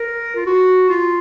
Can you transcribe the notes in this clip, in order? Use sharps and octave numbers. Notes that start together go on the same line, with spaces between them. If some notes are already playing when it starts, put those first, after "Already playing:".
Already playing: A#4
F4
F#4
F4